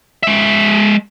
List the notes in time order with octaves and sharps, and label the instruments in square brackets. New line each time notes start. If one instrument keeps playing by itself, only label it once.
[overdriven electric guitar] G#3 E5